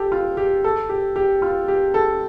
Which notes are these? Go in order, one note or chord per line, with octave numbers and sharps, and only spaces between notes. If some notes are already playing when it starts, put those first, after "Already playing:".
Already playing: G4 A4
F4
G4
A4
G4
G4
F4
G4
A4